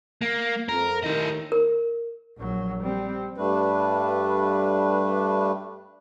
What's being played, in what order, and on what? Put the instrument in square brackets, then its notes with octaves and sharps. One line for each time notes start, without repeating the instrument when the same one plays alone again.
[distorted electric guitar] A#3
[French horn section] F2 [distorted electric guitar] A#4
[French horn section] D#2 A2 D#3 [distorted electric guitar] E4 D#5
[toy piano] A#4
[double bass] A#1 F#3
G3 C4
[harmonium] G2 G3 A3 D4 B4